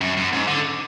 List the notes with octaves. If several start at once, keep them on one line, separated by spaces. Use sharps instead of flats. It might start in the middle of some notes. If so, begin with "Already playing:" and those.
F#2
F#2
G#2
D3